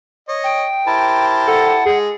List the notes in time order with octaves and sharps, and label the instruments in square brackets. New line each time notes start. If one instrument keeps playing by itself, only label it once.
[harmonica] C#5 D#5
[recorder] G5
[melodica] E4 A5 [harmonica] G4 A#4 C5
[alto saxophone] A4 [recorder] F#5
[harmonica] G#3 [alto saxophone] G#4